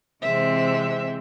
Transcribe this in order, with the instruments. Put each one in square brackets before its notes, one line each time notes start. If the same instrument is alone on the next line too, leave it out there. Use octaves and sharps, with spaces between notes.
[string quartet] C3 E3 G#3 C4 E5